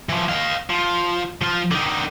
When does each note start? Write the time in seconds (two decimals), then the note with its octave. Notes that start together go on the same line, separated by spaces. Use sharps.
0.09 E3 F3
0.29 D#5 F5
0.70 F3
1.41 F3 F4
1.71 D3 D#4